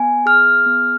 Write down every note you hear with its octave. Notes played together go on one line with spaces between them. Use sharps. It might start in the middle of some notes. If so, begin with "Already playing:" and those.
Already playing: B3 G#5
G#4 F6
B3